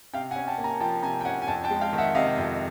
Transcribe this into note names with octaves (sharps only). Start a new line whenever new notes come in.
C3 F5 G5
F#5 G#5
C#4
G5 A5
A#3
G#5 A#5
F3 G5 A5
C3 G#5 A#5
G5
C#4 F#5 G#5
G#5
F2 G5 A5
G5 A5
G#3
F5 G5
D#3
E5 F#5
C3 D#5 F5
F2